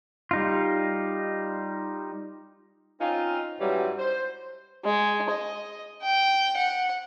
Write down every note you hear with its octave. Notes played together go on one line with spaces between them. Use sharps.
G3 D#4 F4
C4 C#4 D#4 F4
G#2 E3 F#3 G3 C#4
C5
G#3
D#5
G5
F#5